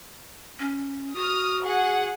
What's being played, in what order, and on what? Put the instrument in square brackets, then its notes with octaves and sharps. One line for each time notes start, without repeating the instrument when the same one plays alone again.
[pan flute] C#4
[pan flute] F#4 [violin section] D#6 F6
[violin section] G#4 F#5